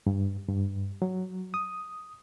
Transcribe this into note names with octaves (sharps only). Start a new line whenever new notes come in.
G2
G2
F#3
D#6